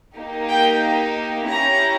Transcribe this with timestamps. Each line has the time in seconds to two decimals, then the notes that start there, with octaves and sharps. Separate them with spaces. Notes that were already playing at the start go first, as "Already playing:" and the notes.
0.16 A#3 D#4 G4
0.49 G5
1.48 C#4 E4 G4 A#5